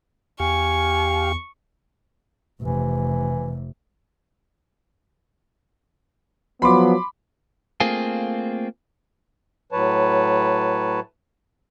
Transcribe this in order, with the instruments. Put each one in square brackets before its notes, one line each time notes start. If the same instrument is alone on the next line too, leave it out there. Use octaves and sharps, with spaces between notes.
[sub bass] E2 [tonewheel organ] G4 F5 [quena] G#5 [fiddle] C#6
[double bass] F1 C3 [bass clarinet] E3
[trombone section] F3 F#3 B3 [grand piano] B5 C6 D6
[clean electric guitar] A3 A#3 C4 F4 G#4
[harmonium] A2 F#3 B4 C#5 A5